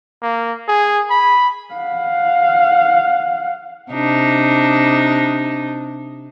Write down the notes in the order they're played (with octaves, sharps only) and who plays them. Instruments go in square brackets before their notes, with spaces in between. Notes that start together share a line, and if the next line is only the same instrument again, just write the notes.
[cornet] A#3
G#4
B5
[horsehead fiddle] F5 F#5
[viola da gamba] C3 D4 D#4